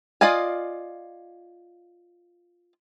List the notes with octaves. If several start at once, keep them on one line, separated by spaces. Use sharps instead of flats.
F4 D5 D#5 F5 G#5